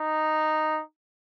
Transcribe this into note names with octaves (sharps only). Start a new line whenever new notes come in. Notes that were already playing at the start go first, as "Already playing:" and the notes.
Already playing: D#4